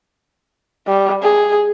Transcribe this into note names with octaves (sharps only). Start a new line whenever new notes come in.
G3
G#4